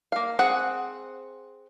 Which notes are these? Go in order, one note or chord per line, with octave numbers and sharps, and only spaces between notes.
A#3 F5
C4 G#4 F#5